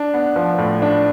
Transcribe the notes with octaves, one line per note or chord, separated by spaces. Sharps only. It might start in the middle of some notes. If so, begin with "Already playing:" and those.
Already playing: D4
B3
F3
A2
D4